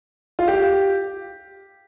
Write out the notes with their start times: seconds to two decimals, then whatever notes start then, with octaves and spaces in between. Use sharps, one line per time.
0.39 F4
0.48 G4